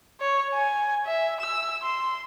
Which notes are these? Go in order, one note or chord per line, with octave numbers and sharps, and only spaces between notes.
C#5
G#5
E5
E6
C6